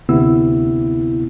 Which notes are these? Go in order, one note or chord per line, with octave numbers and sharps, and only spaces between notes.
D2 C3 B3 E4 E6